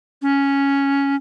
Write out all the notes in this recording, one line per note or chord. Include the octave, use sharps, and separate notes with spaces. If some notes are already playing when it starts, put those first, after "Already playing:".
C#4